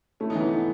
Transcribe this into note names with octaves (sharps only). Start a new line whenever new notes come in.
A3 C#4 E4
B3 D#4
E3
B3 D#4
B3